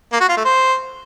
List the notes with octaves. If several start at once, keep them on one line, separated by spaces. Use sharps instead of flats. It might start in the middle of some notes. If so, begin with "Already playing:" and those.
A#3
F#4
F4
A3
C5